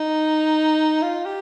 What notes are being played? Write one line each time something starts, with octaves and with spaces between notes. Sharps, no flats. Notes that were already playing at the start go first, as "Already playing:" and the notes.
Already playing: D#4
F4
G4